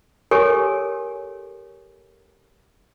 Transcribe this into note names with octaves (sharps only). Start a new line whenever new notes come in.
G4 A4 A#4 C#5 G#5 C#6